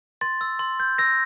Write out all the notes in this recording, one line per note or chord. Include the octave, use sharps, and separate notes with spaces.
C6 A6
E6
C6
G6
E6 A#6